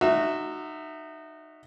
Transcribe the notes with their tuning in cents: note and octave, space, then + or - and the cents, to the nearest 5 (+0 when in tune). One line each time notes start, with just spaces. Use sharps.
D#4 -25 F#4 +0 E5 +0